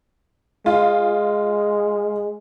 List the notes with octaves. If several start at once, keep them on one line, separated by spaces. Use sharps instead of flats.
G#3 F4